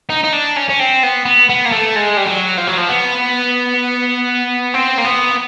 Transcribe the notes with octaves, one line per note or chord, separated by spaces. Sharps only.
D#4
D#4
D4
C#4
C#4
C4
B3
B3
B3
A#3
A3
G#3
G3
F#3
F3
F#3
F3
B3
C4
A#3
B3